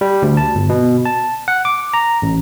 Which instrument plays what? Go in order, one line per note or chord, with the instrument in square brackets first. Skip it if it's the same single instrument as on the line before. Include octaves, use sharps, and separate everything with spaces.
[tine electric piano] G3
D2
A5
G1
B2
A5
F#5
D6
A#5
A1